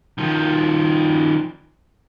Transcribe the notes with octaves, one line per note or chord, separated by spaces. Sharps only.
D#3 F3